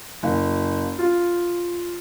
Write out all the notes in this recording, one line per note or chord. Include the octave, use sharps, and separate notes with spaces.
F#1
F4